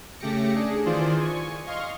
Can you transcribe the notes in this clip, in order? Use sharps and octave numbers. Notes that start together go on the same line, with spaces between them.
C#3 A3 G4 D6 A#6 C#7
D4 G#4
D#3 E3 F4 G#4 C5 D5
G#5 C#6
D#5 F5 C6 C#6 F6